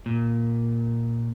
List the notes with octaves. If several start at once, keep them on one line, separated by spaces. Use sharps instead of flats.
A#2